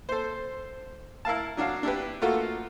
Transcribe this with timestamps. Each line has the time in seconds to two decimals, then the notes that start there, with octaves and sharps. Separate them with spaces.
0.09 A4 C5
1.25 E4 A#4 F5 A5
1.57 F#3 D4 F#4 F5
1.83 D4 E4 G4 B4
2.22 A3 A#3 F4 F#4 A4